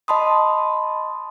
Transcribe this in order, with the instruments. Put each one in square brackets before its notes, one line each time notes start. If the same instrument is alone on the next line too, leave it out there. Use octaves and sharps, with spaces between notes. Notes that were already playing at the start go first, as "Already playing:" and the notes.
[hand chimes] D#5 A5 B5 C6 D#6